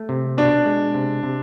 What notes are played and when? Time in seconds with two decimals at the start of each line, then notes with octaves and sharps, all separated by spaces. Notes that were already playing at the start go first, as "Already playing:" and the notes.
Already playing: A3
0.09 C3
0.38 B2 D4
0.66 G#3
0.94 C3
1.23 C3